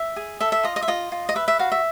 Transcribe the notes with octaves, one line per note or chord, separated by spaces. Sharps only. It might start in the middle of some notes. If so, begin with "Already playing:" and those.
Already playing: E5
G#4
A4 E5
E5
F4 D#5
D#5
E5
F4 D#5
F4
D#5
B4 E5
E5
F#4 F5
E5